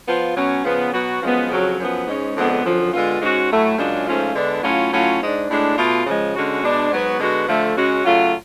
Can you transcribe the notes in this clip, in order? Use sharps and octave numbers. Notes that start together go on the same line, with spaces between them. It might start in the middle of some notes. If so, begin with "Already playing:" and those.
F3 B3 F4
B2 F#3 C#4
C#3 F3 B3
B2 F#3 B3 F#4
F#2 F3 G#3 B3
F2 C#3 F#3
F#2 F3 B3
G#2 G#3 C#4
F2 D3 G#3 B3 D4
F#2 D3 F3
D3 G#3 B3 F4
G#2 G#3 C#4 F#4
A2 F#3 A3
F#2 C#3 G#3 D4 F4
G#2 F3 A3 C#4 F4
D3 G#3 B3 D4
A2 F#3 C#4 F4
A2 F#3 C#4 F4
G#2 G#3 D4
A2 G#3 D4
B2 A3 F4
C#3 F3 G#3
D3 G#3 C#4 F#4
B2 G#3 D4
G#2 F#3 B3 F#4
D3 G#3 B3 F#4
D3 F3 A3
C#3 G#3 C#4 F#4
C#3 F#3 A3 F4